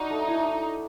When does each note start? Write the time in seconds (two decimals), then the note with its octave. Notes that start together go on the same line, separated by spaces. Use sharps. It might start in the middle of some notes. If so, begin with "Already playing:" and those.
Already playing: D4 D#4 F#4
0.10 A3
0.27 E4